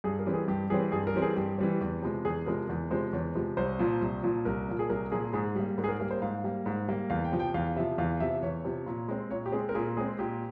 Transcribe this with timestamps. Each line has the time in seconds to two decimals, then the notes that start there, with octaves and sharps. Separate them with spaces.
0.04 G2 G#4
0.19 A#4
0.26 E3 G3 C4
0.34 G#4
0.48 G2 G4
0.70 E3 G3 C4 G#4
0.92 G2 G#4
1.07 A#4
1.14 E3 G3 C4
1.22 G#4
1.36 G2 G4
1.58 E3 G3 C4
1.81 E2
2.02 C3 F3 G#3
2.25 E2 G#4
2.46 C3 F3 G#3 A#4
2.69 E2
2.91 C3 F3 G#3 C5
3.13 E2 C#5
3.35 C3 F3 G#3
3.57 C2 C5
3.79 A#2 F3
4.01 C2
4.23 A#2 F3
4.45 C2 A#4
4.68 A#2 F3
4.79 G#4
4.90 C2 A#4
5.12 A#2 F3 G#4
5.33 G#2 G#4
5.55 G3 A#3
5.78 G#2 A#4
5.84 G#4
5.88 A#4
6.00 G3 A#3 A#4
6.11 C5
6.22 G#2 F5
6.44 G3 A#3
6.66 G#2
6.88 G3 A#3
7.10 E2 F5
7.24 G5
7.32 C3 F3
7.39 G5
7.54 E2 F5
7.76 C3 F3 E5
7.98 E2 F5
8.20 C3 F3 E5
8.42 E2 C#5
8.65 C3 F3
8.86 A#2
9.08 G#3 C4
9.31 A#2 C#5
9.46 G4
9.52 G#3 C4 G#4
9.69 A#4
9.75 A#2 G#4
9.97 G#3 C4 G#4
10.19 A#2 G4